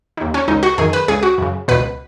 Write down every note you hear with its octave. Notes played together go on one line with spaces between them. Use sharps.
D#2 D#3
C#4
C#2 C#3 D#4
F#4
F#2 D#3 G#4
B4
C#2 C#3 G#4
F#4
F#2 C#3
C#2 B2 B4